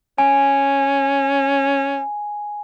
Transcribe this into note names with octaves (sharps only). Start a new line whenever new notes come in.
C#4 G#5